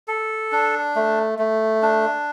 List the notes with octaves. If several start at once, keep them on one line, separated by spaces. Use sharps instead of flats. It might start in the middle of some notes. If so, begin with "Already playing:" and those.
A4
D4
A3
A3
D4